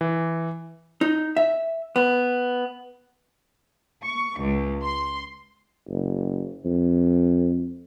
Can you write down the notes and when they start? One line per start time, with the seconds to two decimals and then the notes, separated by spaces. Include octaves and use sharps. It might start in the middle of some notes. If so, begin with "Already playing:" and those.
0.01 E3
1.01 D#4
1.37 E5
1.96 B3
4.04 C#6
4.40 C#2
4.83 C6
5.89 F#1
6.65 F2